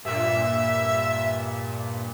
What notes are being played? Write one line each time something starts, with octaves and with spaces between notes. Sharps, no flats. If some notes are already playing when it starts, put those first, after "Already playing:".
G2 A#2 E5